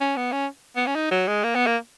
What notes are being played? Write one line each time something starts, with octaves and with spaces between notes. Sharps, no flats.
C#4
B3
C#4
B3
C#4
D#4
F#3
G#3
A#3
B3
A#3